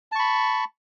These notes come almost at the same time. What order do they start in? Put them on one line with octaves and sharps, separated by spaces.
A5 C#6 B5